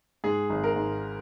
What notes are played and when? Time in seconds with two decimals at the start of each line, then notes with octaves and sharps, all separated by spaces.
0.24 G#2 G#4
0.50 G#1
0.64 A#4
0.76 G#2